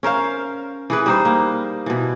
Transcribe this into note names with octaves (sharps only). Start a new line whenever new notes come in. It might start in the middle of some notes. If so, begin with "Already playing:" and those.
C#4 A#4 C5 F5
E3 G#4 B4
G3 D#4 C5
A#3
B2 E3